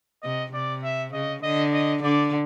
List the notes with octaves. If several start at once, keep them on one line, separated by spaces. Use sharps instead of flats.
C3 D#5
C3 D5
E5
C#3 D#5
D3 D#5
D#5
D3 D5